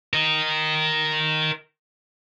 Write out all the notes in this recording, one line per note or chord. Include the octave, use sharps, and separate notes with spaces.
A#4 D#5